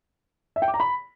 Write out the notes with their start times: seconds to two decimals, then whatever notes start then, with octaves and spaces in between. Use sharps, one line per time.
0.56 E5
0.62 G5
0.68 D6
0.74 A#5
0.80 B5